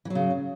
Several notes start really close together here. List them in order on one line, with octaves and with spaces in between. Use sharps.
E3 F#3 C#3